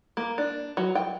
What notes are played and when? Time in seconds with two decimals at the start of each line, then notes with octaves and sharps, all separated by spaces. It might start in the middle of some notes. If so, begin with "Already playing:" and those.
0.17 A#3
0.38 D4
0.77 F#3
0.95 G5